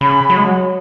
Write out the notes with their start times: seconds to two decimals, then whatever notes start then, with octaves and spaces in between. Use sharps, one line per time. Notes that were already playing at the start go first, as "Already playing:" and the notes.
0.01 C#3 B5
0.30 F#3
0.37 G#3
0.44 F#3